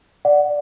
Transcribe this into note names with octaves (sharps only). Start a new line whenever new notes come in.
D5 F#5